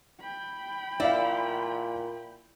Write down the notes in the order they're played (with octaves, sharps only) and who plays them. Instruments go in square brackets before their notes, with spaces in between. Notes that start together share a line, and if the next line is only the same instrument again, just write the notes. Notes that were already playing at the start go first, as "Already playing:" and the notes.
[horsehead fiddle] G5 B5
[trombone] A#2 [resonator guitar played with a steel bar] E4 [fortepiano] D5 F5